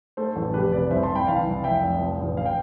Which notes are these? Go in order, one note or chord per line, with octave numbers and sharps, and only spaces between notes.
A3 A4 C5
A1
F1 G4 B4
C3 B4 D5
C2 C5 E5
A5 C6
C2
G5 B5
E3 F5 A5
C2
F1 E5 G5
F1
F3
A1
F5
G5